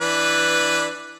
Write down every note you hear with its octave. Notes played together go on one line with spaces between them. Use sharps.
E3 D4 B4